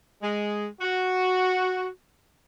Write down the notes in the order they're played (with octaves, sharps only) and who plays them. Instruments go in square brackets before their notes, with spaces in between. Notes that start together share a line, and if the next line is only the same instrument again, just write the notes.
[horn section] G#3
F#4